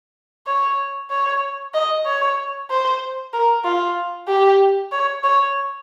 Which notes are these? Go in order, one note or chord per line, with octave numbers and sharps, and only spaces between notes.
C#5
C#5
D#5
C#5
C5
A#4
F4
G4
C#5
C#5